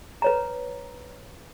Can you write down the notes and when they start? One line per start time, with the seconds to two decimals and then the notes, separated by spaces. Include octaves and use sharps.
0.22 B4 C#5 A#5